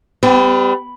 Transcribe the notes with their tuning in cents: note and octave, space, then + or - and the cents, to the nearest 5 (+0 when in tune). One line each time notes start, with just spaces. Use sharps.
G3 +15 B3 +45